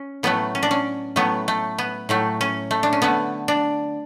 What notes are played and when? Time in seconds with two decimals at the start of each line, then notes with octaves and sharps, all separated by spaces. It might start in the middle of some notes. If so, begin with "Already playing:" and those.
Already playing: C#4
0.23 A2 F#3 A3 B3
0.55 C#4
0.63 D4
0.71 C#4
1.16 A2 F#3 A3 B3
1.48 A3
1.78 B3
2.09 A2 F#3 A3
2.41 C#4
2.71 A3
2.83 D4
2.93 C#4
3.02 D3 A3 B3
3.48 D4